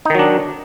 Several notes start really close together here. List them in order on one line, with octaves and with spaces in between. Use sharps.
D#4 D#3 F#3 D4